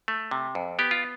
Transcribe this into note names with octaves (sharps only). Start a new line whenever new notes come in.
A3
C3
F2
B3 G4
F4